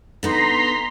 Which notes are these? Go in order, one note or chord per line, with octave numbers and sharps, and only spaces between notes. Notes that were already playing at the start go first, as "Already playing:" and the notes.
D3 B3 D#4 A#5 C6 B6